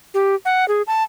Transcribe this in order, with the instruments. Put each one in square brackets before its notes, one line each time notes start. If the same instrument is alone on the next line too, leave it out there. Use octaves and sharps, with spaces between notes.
[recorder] G4
F#5
G#4
A5